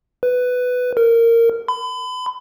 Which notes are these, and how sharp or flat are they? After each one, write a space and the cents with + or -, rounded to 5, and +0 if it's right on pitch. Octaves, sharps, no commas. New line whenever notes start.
B4 +10
A#4 -15
B5 +35